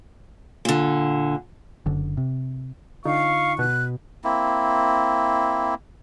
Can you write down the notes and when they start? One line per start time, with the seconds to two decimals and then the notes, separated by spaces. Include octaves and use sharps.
0.65 A#2 D3
1.86 F#1 D3
2.17 C3
3.05 D3 D#4 F4 F5 C#6
3.59 B2 F#6
4.24 A#3 C4 E4